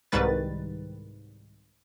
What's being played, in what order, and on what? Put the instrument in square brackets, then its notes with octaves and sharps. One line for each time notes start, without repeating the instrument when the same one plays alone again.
[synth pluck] C2 G#2 D#3 G3 B4 A6